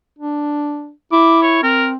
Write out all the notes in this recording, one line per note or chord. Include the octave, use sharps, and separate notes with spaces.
D4
E4 D6
C#5
C4 A#4